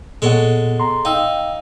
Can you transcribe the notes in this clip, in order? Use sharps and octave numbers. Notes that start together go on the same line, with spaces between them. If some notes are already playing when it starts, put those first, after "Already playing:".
A#2 G#3 B3 A4 C#5 F#5
A#5 C6
D#4 F5 G5 E6